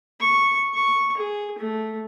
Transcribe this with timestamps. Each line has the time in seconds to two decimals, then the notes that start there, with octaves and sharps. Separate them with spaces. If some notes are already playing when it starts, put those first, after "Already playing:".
0.20 C#6
0.74 C#6
1.17 G#4
1.58 A3